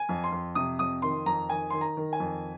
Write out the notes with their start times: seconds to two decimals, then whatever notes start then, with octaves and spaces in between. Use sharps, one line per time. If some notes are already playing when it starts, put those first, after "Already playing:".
Already playing: G#5
0.09 F2
0.24 C6
0.32 F2
0.55 C3 D#6
0.79 F2 D#6
1.02 D#3 C6
1.26 F2 A#5
1.49 D#3 G#5
1.70 D#3 C6
1.81 A#5
1.97 D#3
2.13 G#5
2.20 F2